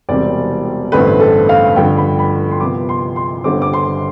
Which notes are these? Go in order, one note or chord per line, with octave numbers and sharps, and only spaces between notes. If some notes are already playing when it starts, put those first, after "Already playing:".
E1 E2 C3 G3 C4 D5
A1 G2 D3 A3 C4 B4
A4
F5
G2 D3 F3 G5
B5
B5
C6
C2 C3 F3 B3 D6
C6
C6
G1 G2 D3 G3 C4 D6
D6
C6